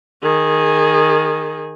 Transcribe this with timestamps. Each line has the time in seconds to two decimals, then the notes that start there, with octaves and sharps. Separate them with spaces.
0.23 D#3 G#4